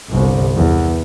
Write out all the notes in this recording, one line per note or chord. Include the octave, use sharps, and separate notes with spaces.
G1 C2
E2